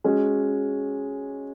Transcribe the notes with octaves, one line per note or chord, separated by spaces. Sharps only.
G#3 C#4 F#4